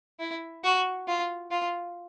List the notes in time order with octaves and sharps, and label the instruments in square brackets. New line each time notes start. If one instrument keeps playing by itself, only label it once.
[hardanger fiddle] E4
F#4
F4
F4